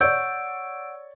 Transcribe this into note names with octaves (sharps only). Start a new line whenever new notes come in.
C#5 D5 F#5 E6 G6 D7